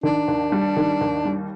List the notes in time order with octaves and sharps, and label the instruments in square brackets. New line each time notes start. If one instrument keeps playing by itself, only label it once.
[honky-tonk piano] D#3 [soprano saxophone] D4
[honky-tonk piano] D#2
G3
D#3
D#2
G3